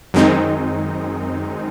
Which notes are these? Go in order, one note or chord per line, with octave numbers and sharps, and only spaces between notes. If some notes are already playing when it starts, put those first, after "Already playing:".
F#2 D#3 G#3 C4 D#4